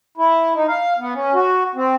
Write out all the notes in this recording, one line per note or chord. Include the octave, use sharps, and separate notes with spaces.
E4
D#4
F5
B3
C#4
F#4
C4